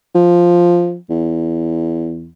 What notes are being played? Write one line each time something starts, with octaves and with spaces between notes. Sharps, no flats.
F3
E2